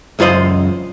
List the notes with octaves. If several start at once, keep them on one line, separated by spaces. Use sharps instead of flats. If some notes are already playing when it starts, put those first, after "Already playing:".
C#2 F#2 F4 C5 D#5